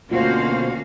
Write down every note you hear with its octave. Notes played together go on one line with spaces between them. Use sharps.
D2 B2 A#3 C#4 F4 F#4 C5 F5